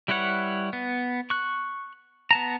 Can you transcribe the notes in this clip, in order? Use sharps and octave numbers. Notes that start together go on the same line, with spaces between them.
G3 E4 B4 C#5 F#5
B3
C#6 F#6
B3 A5 A#5